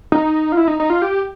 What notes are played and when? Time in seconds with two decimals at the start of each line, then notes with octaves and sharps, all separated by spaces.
0.12 D#4
0.52 F4
0.57 E4
0.68 D#4
0.80 D#4
0.90 F4
1.02 G4